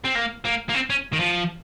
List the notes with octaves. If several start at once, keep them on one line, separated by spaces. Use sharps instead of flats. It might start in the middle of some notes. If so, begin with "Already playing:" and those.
C4
A#3
A#3
A#3
C4
C#4
D#3
F3